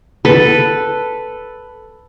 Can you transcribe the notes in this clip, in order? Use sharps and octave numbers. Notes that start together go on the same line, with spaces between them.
A4 B4